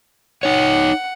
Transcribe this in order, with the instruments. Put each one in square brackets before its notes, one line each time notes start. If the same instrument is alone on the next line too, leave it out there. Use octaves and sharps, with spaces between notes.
[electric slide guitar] D#4 C#5 [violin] F#5